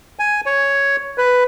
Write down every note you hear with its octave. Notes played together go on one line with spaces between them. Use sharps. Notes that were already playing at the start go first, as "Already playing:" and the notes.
G#5
C#5
B4